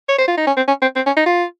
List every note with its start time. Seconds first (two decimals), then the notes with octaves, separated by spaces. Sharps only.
0.09 C#5
0.18 C5
0.28 F4
0.37 D#4
0.47 C#4
0.57 C4
0.68 C#4
0.82 C4
0.96 C4
1.06 C#4
1.17 D#4
1.26 F4